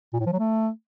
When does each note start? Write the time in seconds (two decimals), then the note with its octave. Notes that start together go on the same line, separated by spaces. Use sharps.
0.13 A#2
0.20 A2
0.26 F3
0.33 F#3
0.39 A3